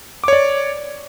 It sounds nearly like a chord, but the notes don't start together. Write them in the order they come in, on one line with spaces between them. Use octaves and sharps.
D6 C#5 D5